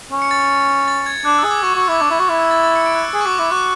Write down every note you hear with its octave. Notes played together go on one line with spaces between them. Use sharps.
C#4
C#7
A6
A6
G#6
D4 F#6
E6
G#4
D6
F#4 C#6
F#4
E6
E4 D6
D4 C#6
E4
F#4 D6
E4
E6
A6
A6
C#7
D7
F#6
E6
G#4 F#6
C#6
F#4 D6
E4 D6
F#4 F#6